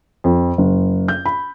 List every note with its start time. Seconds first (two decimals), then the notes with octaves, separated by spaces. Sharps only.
0.24 F2
0.58 F#1
1.08 G6
1.26 B5